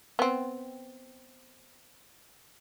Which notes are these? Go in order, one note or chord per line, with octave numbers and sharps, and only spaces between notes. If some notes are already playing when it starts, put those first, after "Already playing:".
B3 C4